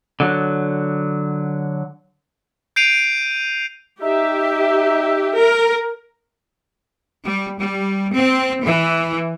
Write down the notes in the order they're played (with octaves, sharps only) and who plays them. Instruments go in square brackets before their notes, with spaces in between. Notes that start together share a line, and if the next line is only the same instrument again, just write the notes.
[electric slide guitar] D3 F#3
[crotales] G6 C7 D7 D#7 F7
[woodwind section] D#4 E5 [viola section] G4
[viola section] A#4
[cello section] G3
G3
C4
E3